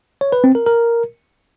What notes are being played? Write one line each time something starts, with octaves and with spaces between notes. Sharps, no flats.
C#5
B4
C4
A#4
A#4